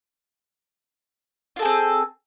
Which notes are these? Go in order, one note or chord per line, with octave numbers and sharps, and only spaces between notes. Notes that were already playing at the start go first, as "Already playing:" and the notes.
C4 F4 G#4 A4